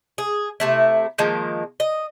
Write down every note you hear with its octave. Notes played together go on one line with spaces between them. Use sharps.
G#4
C3 A3 E4
D#3 F3 G#3 A#3
D#5